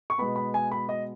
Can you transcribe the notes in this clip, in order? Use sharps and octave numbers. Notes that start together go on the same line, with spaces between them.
C#6
B2 G#3 B3 B5
B5
G#5
B5
D#5